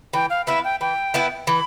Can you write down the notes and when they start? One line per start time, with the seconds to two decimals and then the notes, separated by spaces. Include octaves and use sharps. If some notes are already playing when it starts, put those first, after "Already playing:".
0.13 E3 G5
0.30 F5
0.47 B3 E4 B4 E5
0.64 G5
0.81 E3 G5
1.14 B3 E4 B4
1.47 E3 B5